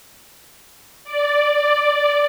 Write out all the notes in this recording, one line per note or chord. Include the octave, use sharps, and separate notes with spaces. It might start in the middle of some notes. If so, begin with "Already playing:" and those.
D5